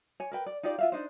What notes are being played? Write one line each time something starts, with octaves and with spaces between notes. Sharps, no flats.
C#5 G#5
A#4 B4 G5
D5
D#4 F4 G4 D5
F4 E5 F5
D4 D#4 C5